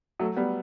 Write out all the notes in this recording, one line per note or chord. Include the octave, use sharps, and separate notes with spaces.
F#3 A3
G3 B3